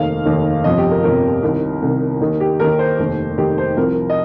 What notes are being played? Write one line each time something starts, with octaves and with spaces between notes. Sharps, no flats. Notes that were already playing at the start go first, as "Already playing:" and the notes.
Already playing: F1 D#2 D#3 F5
F1 D#2 D#3
G1 F2 C3 F3 D#5
G4
A#4
G1 F2 C3 F3 A#4
C2 C3 D#3
C2 C3 D#3
D#2 D#3
G4
D#2 D#3 A#4
C5
F1 D#2 D#3
F1 D#2 D#3 G4
C5
C2 C3 F3 A#4
D#5